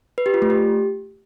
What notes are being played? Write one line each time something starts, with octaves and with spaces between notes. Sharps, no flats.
B4
G4
F4
A3
G4